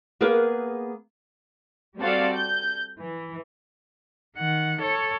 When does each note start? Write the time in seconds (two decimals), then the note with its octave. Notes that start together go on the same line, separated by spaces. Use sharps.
0.21 A#3 B3 G#4 A#4 B4 F5
1.99 G3 C4 F#4 A4 D5 F5
2.33 G6
3.02 E3
4.38 D#3 F#5
4.81 A4 C#5